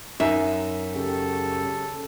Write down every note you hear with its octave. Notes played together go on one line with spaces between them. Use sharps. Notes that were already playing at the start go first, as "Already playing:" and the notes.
F#2 D#4 E5
C#3 G4 A4